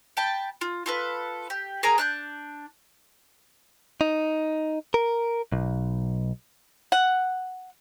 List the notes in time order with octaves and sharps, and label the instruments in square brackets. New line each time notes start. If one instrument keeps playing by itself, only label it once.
[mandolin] G5 A5 B5
F4
F4 A4 B4
G4
G#4 A#4 G#5 A#5
D4 F#6 G6
[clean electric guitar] D#4
A#4
B1
[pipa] F#5